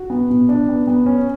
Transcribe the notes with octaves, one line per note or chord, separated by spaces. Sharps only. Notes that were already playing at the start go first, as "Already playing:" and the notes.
Already playing: F#4
B3
B2
D4
B3
B3
C#4